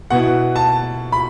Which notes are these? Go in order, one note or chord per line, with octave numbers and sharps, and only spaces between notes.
B2 B3 E4 F#5
A5
B5